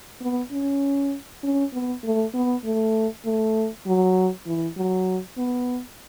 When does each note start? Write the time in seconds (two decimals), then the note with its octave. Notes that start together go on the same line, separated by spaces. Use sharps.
0.21 B3
0.52 C#4
1.43 C#4
1.73 B3
2.03 A3
2.34 B3
2.65 A3
3.25 A3
3.86 F#3
4.46 E3
4.77 F#3
5.38 B3